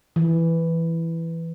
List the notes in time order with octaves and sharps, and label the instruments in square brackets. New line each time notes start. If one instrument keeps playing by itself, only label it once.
[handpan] E3